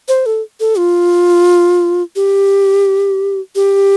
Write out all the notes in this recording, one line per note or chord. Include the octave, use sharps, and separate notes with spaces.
C5
A4
A4
F4
G4
G4